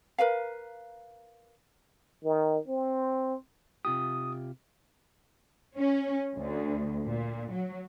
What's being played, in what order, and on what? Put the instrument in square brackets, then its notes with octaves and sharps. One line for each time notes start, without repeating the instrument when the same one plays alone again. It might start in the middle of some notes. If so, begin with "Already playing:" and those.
[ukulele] A#4 B4 F5
[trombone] D#3
C4
[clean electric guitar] C3 F4 G4 [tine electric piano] D#6
[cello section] C#4
D2
A#2
F#3